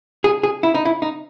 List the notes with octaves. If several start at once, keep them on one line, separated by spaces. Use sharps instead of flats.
G#4
G#4
E4
D#4
E4
D#4